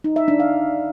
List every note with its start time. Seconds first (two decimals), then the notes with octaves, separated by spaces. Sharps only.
0.04 D#4
0.16 E5
0.28 D4
0.40 F5